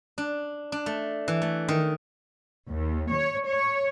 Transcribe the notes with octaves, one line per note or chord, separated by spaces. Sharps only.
D4
D4
A3
E3
A3
D#3
D#2
C#5
C#5